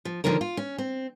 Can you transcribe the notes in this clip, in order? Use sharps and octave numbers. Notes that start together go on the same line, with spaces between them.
F3
D3 D#3 F3 C#4 A#4
F4
C#4
C4